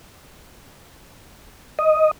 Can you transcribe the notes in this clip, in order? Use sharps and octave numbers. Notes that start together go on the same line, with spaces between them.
D#5